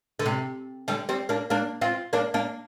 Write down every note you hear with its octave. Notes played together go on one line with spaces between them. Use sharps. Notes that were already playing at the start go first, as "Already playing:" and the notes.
D3
C3
D3 G3
G3 C4
A#3 D4
A#3 D4
C4 F4
A#3 D4
A#3 D4